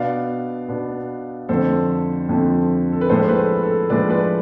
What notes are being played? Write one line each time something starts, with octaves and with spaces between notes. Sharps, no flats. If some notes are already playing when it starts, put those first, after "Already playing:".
Already playing: B2 B3 D4 D5 F5
B2 B3 D4
F2 D3 F3 A3 A4 C5
F2 D3 F3 A3
A4
B4
A2 F3 G#3 D4 A4 C5
C5
B4
A4
A4
A2 F3 G#3 D4 B4 D5
B4 D5